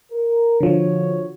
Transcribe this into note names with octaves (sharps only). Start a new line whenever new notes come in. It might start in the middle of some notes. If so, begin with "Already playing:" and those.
A#4
D3 F3 F#4 C#5